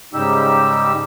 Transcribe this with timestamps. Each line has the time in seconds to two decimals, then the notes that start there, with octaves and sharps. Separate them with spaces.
0.14 G#2 C#3 G3 D#4 G4 E6